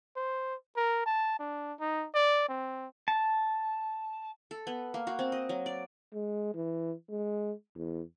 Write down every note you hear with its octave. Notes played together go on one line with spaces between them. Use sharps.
C5
A#4
A5
D4
D#4
D5
C4
A5
A4
B3
A#3
F#4
C4
D#5
F#3
D5
G#3
E3
G#3
E2